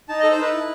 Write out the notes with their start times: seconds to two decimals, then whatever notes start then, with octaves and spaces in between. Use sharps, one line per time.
0.09 D#4 A5
0.20 A4 D#5
0.31 C5
0.38 D#4 B4
0.53 E4